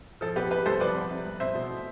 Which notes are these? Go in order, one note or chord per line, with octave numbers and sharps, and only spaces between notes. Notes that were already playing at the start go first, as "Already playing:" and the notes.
F3 A4
B3 G4 B4
C3 G4 B4
C2 A4 C5
F3 B4 D5
B3
C3
C2
C4 C5 E5
B2
A3